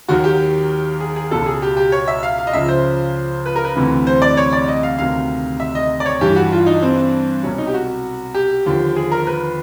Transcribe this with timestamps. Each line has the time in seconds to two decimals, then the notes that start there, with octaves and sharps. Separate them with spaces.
0.08 D#2 D#3 F#3 F#4
0.24 G4
1.00 G#4
1.16 G#4
1.31 C#2 B2 F#3 A4
1.46 G#4
1.62 G4
1.77 G4
1.92 C#5
2.08 E5
2.23 F5
2.38 F5
2.47 D#5
2.53 C#2 C#3 F3 E5
2.68 C5
3.46 B4
3.56 A#4
3.65 B4
3.76 D2 C3 E3
4.07 C5
4.22 D5
4.37 C#5
4.53 D5
4.68 D#5
4.83 F5
4.98 D2 C3 D#3 F#3 F5
5.60 E5
5.75 D#5
6.00 D5
6.06 C#5
6.21 G2 E3 G4
6.36 F#4
6.52 F4
6.66 D#4
6.82 C4
7.43 C2 B2 F#3 C#4
7.58 D#4
7.67 G4
7.74 F#4
8.35 G4
8.66 D#2 D3 F3
8.96 G#4
9.12 A#4
9.27 B4